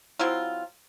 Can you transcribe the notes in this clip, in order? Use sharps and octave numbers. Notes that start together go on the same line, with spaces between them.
F#3 C4 E4 F4